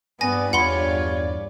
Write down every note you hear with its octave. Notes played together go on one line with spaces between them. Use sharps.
G2 B3 D5 G#5 A#6
E2 F4 C#5 F#5 B5 C6